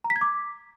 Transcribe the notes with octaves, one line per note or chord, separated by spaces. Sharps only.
A#5
B6
G#6
D6